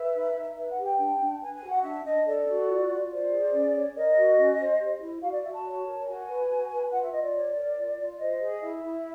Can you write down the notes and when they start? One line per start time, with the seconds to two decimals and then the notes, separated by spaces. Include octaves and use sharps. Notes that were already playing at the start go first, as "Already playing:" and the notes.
Already playing: B4 E5
0.14 D#4
0.35 D#4
0.56 B4 E5
0.70 F#5
0.77 G4
0.84 G5
0.99 D4
1.19 D4
1.40 B4 G#5
1.55 G#5
1.61 F#4
1.69 F#5
1.83 D4 E5
2.04 D4 D#5
2.25 A4 D5
2.47 F#4
2.67 F4
2.88 F4
3.10 C5 D5
3.31 G#4
3.52 C#4
3.74 C#5
3.95 A#4 D#5
4.17 F#4
4.37 C#4
4.59 C5
4.79 G4
5.01 E4
5.21 F#4 F5
5.32 D5
5.43 F#4 E5
5.54 A5
5.64 C#5
5.85 A#4
6.06 F#4 G#5
6.28 B4
6.48 F#4
6.70 B4
6.91 F4 F#5
7.02 E5
7.12 F4 D#5
7.23 D5
7.34 C#5
7.55 A#4
7.76 F4
7.98 F4
8.18 C5 D#5
8.40 G#4
8.60 E4 E5
8.82 E4